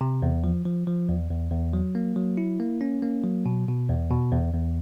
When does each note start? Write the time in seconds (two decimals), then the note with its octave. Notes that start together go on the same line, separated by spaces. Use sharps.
0.01 C3
0.22 E2
0.44 F3
0.65 F3
0.87 F3
1.09 E2
1.31 E2
1.52 E2
1.73 F#3
1.95 A#3
2.16 F#3
2.37 E4
2.60 A#3
2.81 C#4
3.02 A#3
3.24 F#3
3.46 B2
3.68 B2
3.89 E2
4.11 B2
4.32 E2
4.53 E2